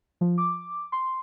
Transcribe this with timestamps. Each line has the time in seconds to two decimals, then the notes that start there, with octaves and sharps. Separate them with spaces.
0.21 F3
0.38 D6
0.92 C6